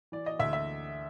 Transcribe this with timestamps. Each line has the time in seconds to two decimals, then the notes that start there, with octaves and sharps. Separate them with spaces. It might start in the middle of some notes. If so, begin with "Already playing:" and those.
0.12 E3 D5
0.26 D#5
0.39 D2 E5
0.53 E5